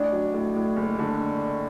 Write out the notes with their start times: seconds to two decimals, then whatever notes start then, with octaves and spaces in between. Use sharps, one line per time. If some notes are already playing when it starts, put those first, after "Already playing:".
Already playing: A1 D4
0.12 F#3
0.33 A2
0.55 A2
0.76 F#1
0.99 D3